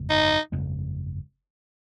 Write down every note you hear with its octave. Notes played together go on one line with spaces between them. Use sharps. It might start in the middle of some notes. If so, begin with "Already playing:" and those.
Already playing: G1 F2 C#3 G#3
D#4
G1 F2 C#3 G#3